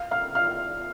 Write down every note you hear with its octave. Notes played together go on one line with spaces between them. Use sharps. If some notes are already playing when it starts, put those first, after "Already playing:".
Already playing: F5 F6
F5 F6
F5 F6